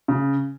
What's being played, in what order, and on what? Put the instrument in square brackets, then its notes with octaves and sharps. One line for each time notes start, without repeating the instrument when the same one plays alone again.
[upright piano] C#3